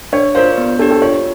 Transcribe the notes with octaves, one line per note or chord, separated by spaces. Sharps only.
D4 C#5
F4 A#4 C5 D5 F5
B3
D4 G4 A4
A4
F4 C#5